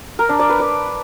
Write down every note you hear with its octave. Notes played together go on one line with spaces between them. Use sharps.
A#4
D4
D5
B4
D5